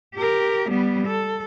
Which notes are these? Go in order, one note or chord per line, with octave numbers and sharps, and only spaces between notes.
G4 A#4
G3 B3
A4